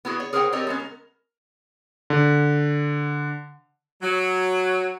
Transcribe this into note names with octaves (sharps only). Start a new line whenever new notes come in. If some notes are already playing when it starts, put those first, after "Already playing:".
B3 E4 F#4 G#4
C#5
G#4 A#4 C5 C#5 F#5 G5
C4 G4 A4 A#4 C#5 D#5
G#3 B3 C#4
A#4
D3
F#3